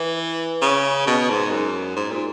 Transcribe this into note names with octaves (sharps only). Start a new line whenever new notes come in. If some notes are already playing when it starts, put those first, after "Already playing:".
Already playing: E3
C#3
B2
G#2
F#2
G#2
A#2